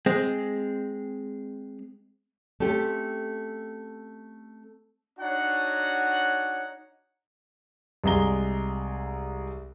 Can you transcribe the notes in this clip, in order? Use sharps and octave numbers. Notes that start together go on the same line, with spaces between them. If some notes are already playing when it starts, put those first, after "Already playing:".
G#3 C4
A3 C4 C#4 G4 A4
D4 D#4 F#4 C#5 F#5
C2 G#3 G#4 A#5 G7